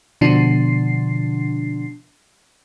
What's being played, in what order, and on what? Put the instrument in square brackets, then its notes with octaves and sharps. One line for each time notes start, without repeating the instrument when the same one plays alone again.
[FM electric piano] B2 D3 F3 D4 C7